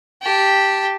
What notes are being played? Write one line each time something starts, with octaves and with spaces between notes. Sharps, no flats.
G4 A5